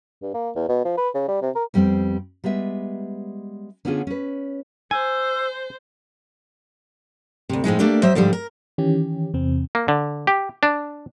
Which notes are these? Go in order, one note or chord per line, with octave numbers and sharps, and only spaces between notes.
G2
A#3
E2
B2
F3
B4
C#3
G3
C3
A#4
F2 G3 G#3 B3 C4
G3 G#3 B3 E5
D3 B3 C#4 D4 F4 G#4
C#4 B4
C5 G#5 E6
D2 C3
A2 F3 G#3 D#4
A3 A#3 D4 G4 D5
F#3 C5 D#5 E5
G#2 D3 F3 G3
A#4
D#3 E3 C#4 G4
E2 C3 C4
A#3
D3
G4
D4